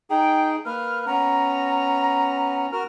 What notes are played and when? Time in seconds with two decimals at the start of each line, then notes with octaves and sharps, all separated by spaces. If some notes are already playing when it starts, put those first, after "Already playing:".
0.10 D#4 G#4 G5
0.65 A#3 B4 F6
1.06 B3 C#4 A#5
2.72 F#4 A#4 F6